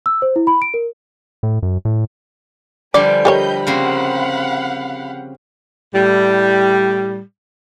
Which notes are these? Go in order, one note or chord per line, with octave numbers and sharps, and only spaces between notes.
E6
C5
E4
B5
D7
A#4
A2
F#2
A2
D3 F3 G3 B4 D5 G#5 D6
G4 A4 A#4 C#5 D#5 B5 G6
C#3 A#3 C4 F5 F#5 B5
A2 G3